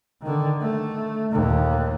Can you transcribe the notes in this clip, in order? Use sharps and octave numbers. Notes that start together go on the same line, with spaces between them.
D3 D#3
A3
D#2 A#2